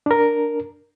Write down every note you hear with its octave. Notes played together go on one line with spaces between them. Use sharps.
D4 A#4